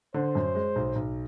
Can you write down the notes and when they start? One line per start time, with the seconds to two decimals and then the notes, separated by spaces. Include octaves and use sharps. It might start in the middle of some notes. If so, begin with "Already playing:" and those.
0.14 D3 C5
0.35 F#2
0.55 G#3
0.76 B1
0.96 B1